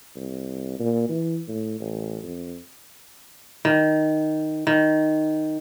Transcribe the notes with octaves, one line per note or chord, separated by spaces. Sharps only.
C2
A#2
E3
A2
A1
F2
D#3
D#3